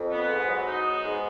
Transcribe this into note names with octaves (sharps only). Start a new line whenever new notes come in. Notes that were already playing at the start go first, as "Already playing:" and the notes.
Already playing: F2
B3
G#2
F#3
D#4
B3
G#2